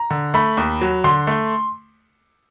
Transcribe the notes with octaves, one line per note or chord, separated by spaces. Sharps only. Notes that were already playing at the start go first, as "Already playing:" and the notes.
Already playing: A#5
D3
A3 B5
D#2
F#3
D3 C6
A3